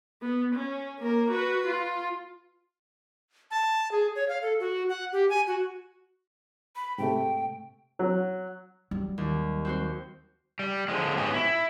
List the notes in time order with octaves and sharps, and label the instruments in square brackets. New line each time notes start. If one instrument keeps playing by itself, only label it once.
[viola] B3
C#4
A#3 A#4
F#4 B4
F4
[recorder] A5
G#4
C#5
F5
A4
F#4
F#5
G4
G#5
F#4
[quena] B5
[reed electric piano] G#2 C3 A3 [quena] G5
[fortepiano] F#3
[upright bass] F#3 [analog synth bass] G3
[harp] D#2
C4 F#4 C5
[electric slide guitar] G3
D3 F3 G#3
G#2 B3 C#4 F#4 G4
E4